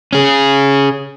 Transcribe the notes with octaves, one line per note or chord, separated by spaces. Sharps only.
C#4 G#4